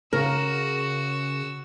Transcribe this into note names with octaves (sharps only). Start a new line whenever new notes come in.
C#3 F#4 A#4 E6